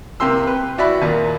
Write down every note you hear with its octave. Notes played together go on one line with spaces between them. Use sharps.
C3 A#3 G4 C6 E6
B4
E4 F#4 D5 E5 B5
D#2 A#2